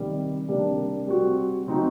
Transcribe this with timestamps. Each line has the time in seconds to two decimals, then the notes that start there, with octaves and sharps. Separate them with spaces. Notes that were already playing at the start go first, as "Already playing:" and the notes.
Already playing: C3 D#3 G3
0.47 C3 G3 A#3 D4
1.07 G3 C4 F#4
1.67 C3 F#3 C4 D#4 F#4